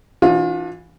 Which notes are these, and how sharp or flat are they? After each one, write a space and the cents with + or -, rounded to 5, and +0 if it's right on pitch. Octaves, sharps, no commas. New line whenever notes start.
E3 +0 D4 +0 F4 +35